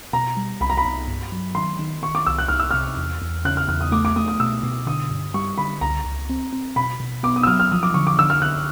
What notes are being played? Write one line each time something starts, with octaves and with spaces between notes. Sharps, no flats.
B2 A#5
G3
C2 B5
A#5
B5
C2
G2
F#3
D#3 C6
D#3
D#3 C#6
D6
C2 E6
F#6
C2 F6
E6
C3 F6
E2
E2
C#3 F#6
F6
E2 F6
D#6
A3 D6
D6
A3 D#6
D#6
B2 E6
B2
D3 D#6
G2
G3 C#6
D3 B5
C#2 A#5
C#2
C4
C4
B2 B5
B2
B3 D6
D#6
E6
F#3 F6
F6
F3 D#6
D6
D3 C#6
D6
D3 E6
F6
D3 F#6